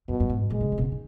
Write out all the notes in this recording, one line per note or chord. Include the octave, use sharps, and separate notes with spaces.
F#2 B2
F#2
G#2
A#2 G#3
C#3
D#3
B2
C#3
D#3